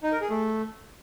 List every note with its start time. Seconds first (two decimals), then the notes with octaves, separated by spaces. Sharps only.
0.03 D#4
0.12 A#4
0.21 G#4
0.30 A3